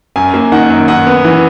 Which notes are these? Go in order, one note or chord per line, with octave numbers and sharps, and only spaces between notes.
F#2 G#5
A#3
D#3 F#5
F#2
F#2 F#5
B3
E3